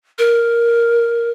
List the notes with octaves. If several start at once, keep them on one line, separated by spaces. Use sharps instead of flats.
A#4